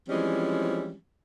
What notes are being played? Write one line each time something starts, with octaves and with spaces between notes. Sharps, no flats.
E3 F3 G3 G#3 C4 C#4